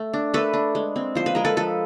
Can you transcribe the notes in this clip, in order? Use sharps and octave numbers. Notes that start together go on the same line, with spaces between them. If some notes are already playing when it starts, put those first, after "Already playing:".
Already playing: A3
D4
A3 A4 B4
D4
G#3
C4
F3 C5
B4
G#3 A#4
A4 B4
F3 A4 B4